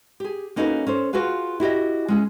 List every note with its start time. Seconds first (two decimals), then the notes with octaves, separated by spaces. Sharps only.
0.20 G4 G#4
0.56 A#3 C#4 D#4 F#4 A4 B4
0.87 C#4 A4 C5
1.13 F4 F#4 G#4 B4 F5
1.60 E4 F#4 G4 D#5
2.08 G#3 C#4 G#4